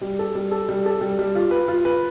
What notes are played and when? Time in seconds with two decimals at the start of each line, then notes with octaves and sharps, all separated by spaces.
0.01 G3
0.19 A4
0.35 G3
0.51 A4
0.69 G3
0.86 A4
1.01 G3
1.19 G3
1.35 F4
1.51 B4
1.68 F4
1.85 B4